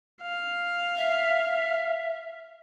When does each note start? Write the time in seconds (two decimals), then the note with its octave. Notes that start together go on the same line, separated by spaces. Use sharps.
0.22 F5
0.97 E5